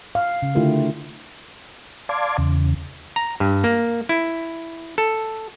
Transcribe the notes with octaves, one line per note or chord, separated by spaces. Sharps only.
F5
C#3
D3 A3 E4 F4 G4 A#4
D5 F5 A5 C6 D6 G#6
E2 C#3
A#5
G2
A#3
E4
A4